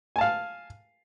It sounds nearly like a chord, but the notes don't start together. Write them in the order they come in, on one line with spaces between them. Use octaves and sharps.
G#5 A5 F5